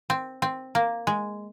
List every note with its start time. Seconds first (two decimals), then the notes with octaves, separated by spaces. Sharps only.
0.10 C4
0.42 C4
0.75 A#3
1.07 G#3